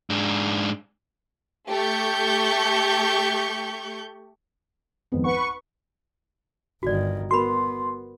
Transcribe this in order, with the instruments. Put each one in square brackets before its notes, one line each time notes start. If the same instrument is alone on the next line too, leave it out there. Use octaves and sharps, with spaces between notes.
[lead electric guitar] G#2 D4
[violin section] A3 G4 C#6 G6
[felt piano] G#1 F2 B3
[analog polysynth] B4 C#6 [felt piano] F#5
[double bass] G1 D#3 [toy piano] F#4 D5
[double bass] B3 [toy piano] F#4 A#4 B5 [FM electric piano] C6